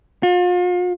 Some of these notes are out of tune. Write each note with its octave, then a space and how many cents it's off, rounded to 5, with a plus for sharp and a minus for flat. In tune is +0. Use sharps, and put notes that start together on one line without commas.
F4 +40